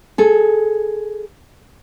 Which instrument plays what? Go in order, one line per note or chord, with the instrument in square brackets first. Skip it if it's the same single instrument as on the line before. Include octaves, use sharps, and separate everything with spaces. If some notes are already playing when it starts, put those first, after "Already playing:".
[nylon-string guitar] G#4 A4